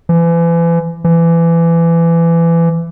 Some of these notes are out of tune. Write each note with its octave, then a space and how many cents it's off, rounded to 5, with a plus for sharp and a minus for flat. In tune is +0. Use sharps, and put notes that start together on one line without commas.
E3 +35
E3 +25